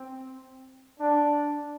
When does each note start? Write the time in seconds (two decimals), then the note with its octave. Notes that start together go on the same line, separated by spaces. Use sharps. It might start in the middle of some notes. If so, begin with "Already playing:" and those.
Already playing: C4
0.99 D4